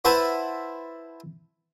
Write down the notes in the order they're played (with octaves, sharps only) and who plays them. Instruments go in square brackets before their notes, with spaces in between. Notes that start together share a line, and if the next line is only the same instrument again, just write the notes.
[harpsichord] E4 B4 C5 E5 F#5 A5